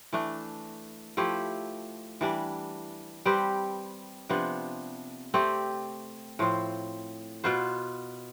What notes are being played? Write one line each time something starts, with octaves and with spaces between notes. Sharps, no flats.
E3 A3 D4
F3 A3 E4 G4
E3 G3 D4
G3 C4 G4 B4
C3 F3 B3 D4
A3 C4 G4 D5
A2 F3 C4
B2 B3 F4 C5